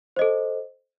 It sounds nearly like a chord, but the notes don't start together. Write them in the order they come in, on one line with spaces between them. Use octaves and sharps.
C5 D#5 A4